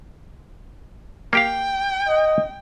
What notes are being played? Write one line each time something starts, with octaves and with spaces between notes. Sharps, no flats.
A#3 G4 F5 G5
D#5